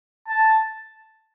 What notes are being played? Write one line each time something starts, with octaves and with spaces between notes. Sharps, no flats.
A5